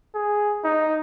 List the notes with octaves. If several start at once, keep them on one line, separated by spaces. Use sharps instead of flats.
G#4
D#4